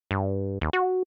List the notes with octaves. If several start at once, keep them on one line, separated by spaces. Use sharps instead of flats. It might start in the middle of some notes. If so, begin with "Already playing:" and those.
G2
D#2
F#4